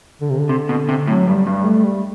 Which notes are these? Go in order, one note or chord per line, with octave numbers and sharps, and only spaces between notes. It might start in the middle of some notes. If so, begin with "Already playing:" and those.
D3
C3
D3
C3
B2
C3
A2 F#3
G2 G3
G2 G3
A3
G3